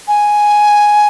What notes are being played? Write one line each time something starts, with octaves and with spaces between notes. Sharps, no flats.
G#5